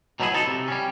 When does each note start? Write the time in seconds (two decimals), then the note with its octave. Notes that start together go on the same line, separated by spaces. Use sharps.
0.20 B2 F#3 A3 C#4 E4 G#4
0.33 F3 D#4 A4
0.47 C3
0.68 G3 C#4